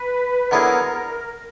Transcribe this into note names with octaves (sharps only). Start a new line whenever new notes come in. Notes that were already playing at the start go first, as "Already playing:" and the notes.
Already playing: B4
D3 F#3 B3 E4 G#4 A#4